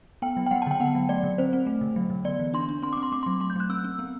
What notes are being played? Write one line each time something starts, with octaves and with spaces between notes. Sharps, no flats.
B3 G5
F#3
G5
G3 F#5
A5
D3 G5
B3 F#5
F#3
A3 D5
D3
C4 C5
C4
A3
D3
F#3
D3
B3 D5
E3
D4 C6
D4
C4 C6
C4 D6
C6
A3 D6
C6
F#3
A3 C6
G6
F#3 F#6
C4 E6
C4
B3